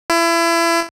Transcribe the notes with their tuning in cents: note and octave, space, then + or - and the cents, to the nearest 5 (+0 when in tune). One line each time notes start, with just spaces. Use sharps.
E4 +30